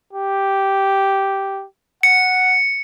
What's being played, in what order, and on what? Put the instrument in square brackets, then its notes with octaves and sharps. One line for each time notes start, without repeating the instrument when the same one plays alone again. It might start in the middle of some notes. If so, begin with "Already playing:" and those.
[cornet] G4
[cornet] F#5 [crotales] C#7